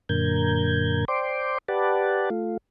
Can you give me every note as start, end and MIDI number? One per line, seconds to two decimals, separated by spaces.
0.09 1.05 42
0.09 1.05 46
0.09 1.05 50
0.09 1.05 70
0.09 1.05 91
0.09 1.05 92
1.08 1.58 72
1.08 1.58 74
1.08 1.58 79
1.08 1.58 84
1.08 1.58 86
1.68 2.30 67
1.68 2.30 71
1.68 2.30 74
1.68 2.30 78
1.68 2.30 81
2.30 2.57 57
2.30 2.57 65